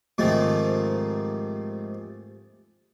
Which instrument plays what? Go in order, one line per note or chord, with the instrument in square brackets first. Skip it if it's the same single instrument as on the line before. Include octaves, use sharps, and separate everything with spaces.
[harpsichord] G#2 C3 D#3 F3 G#3 A3